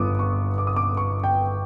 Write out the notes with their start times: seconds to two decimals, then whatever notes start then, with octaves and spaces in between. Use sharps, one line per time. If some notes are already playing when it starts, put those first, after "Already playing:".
Already playing: G1 B3 D6 D#6
0.19 C#6
0.58 D6
0.67 D#6
0.76 D6
0.97 C#6
1.24 G5